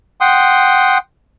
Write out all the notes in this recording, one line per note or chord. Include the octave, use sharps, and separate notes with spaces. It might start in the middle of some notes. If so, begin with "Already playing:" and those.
F#5 G5 C6 D#6